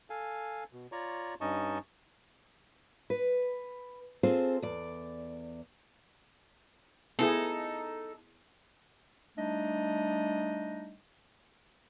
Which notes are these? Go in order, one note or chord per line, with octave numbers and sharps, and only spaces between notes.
A4 F5 G#5
B2
F4 C#5 D5 A#5 C#6
G2 C#4 D#4 D#5 A5 C#6
B4
C4 F4 G#4 A4 C5
E2 D5
B3 D#4 E4 G#4 A4
G3 A3 D4 D#4 D#5